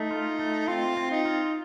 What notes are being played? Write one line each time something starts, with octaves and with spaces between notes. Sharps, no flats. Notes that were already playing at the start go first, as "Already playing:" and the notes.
Already playing: A3 D#4
F4
A3
C4 F4
C4
D#4
F4